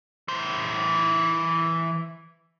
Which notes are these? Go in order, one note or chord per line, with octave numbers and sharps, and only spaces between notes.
E3 C5